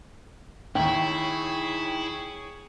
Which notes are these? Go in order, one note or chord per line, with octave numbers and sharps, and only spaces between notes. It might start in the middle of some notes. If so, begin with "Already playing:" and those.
D#2 E4 G#4 C#5 G5